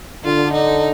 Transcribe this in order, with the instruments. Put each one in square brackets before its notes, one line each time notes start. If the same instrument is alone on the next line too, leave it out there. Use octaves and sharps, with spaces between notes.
[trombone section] D3 [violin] F4
[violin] D#4